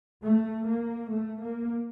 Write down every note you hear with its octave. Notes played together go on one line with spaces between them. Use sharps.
A3
A#3
A3
A#3